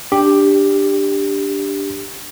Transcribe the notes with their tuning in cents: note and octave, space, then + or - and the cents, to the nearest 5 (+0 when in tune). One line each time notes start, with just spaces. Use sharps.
D4 +0 G4 +5